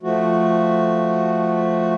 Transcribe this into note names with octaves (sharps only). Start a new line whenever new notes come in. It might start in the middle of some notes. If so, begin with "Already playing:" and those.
F3 A3 F#4